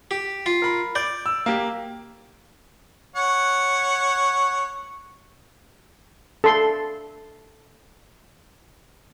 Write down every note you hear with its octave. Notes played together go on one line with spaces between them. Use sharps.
G4
F4
A#4 B5
D5 D6 G6
E6
A#3 G4
C#5 F#5
A4 C6